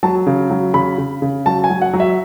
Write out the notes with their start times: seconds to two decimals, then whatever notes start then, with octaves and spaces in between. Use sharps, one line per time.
0.03 F#3 A5
0.27 C#3
0.51 F#3
0.74 C#3 B5
0.98 C#3
1.22 C#3
1.46 F#3 A5
1.64 G#5
1.70 F#3
1.82 F#5
1.94 F#3
2.00 E5